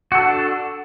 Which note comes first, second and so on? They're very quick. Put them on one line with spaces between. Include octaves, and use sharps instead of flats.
F#4 A4 D4